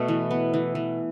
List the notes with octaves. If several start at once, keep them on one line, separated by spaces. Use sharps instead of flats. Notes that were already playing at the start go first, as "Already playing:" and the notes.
Already playing: B2 A3
E3
B3
E3
E3